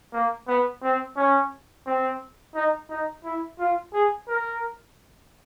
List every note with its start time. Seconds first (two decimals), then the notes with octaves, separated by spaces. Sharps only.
0.13 A#3
0.48 B3
0.83 C4
1.16 C#4
1.86 C4
2.55 D#4
2.90 D#4
3.24 E4
3.59 F4
3.93 G#4
4.28 A#4